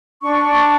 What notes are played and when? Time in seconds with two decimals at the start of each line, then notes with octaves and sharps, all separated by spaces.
0.22 D4 C#6
0.44 D4